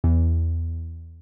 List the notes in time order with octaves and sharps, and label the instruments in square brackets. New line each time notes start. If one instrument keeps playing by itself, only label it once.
[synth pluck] E2